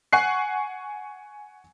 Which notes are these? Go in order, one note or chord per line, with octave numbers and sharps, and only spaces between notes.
F#5 G#5 C#6 F#6 C7